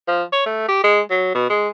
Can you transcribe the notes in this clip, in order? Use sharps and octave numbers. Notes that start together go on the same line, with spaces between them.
F3
C#5
A3
G4
G#3
F#3
B2
G#3